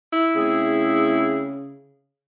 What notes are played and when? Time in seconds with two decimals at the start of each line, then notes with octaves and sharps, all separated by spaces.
0.13 E4
0.36 C#3 A3 C4 G#4